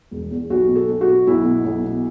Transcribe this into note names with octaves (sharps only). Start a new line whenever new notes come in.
E1
E2
B1 F#4
B2
A4
B1
F#4
B2
B1 E4
B2
B1
B2